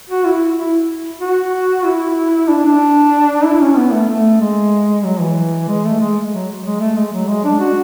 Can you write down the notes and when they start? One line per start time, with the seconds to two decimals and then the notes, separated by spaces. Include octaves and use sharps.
0.10 F#4
0.26 E4
0.57 E4
1.21 F#4
1.86 E4
2.49 D4
2.65 D4
3.45 E4
3.61 C#4
3.77 B3
3.93 A3
4.08 A3
4.41 G#3
5.05 F#3
5.21 E3
5.69 G#3
5.85 A3
6.00 G#3
6.32 F#3
6.65 G#3
6.80 A3
6.96 G#3
7.13 F#3
7.29 G#3
7.45 D4
7.60 F#4